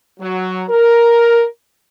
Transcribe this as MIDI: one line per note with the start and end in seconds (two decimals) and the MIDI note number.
0.20 0.64 54
0.69 1.45 70